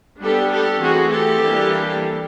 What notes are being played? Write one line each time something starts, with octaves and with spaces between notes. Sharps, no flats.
G3 B3 D4 G4 A4
G4 A4
E3 A3 C4 F#4 G#4
G4 A4
E3 G3 A#3 D4